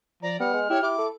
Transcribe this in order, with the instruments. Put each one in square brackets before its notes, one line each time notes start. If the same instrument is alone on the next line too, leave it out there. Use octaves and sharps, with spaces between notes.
[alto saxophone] F3 [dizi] D5 [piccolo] A#5
[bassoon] G3 [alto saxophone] B3 [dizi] F#5 [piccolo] F6
[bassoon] G#3
[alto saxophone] E4 [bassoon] G4 [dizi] C#5
[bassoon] E4 [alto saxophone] G4 [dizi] D6
[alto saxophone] A4